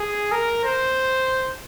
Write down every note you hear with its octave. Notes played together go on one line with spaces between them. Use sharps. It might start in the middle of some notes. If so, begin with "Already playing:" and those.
Already playing: G#4
A#4
C5